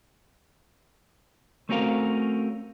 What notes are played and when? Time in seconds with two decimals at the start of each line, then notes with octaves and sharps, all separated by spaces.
1.69 A3 C4 C#4 F#4 A#4 F5